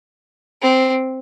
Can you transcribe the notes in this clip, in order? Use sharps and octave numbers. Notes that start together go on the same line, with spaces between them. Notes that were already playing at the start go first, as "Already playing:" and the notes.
C4